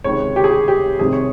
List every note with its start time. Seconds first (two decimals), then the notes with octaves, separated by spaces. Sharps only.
0.04 C#2 C3 D#3 C#5
0.36 G4
0.44 G#4
0.50 G4
0.68 G4
0.99 C2 C3 D#3 G#4
1.13 C#5